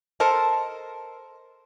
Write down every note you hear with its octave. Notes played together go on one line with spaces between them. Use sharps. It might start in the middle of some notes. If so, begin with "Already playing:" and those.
A4 A#4 C5 D#5 A5